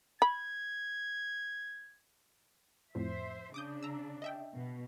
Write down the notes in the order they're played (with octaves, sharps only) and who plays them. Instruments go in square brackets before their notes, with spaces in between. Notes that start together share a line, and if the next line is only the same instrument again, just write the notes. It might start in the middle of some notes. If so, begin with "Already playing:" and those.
[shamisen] B5 [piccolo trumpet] G#6
[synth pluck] F2 A2 F3 [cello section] C5 E5
[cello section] C#3 D4 [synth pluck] D6 D#6 G6
[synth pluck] A#5 E6
D#5 E5 G5
[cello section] B2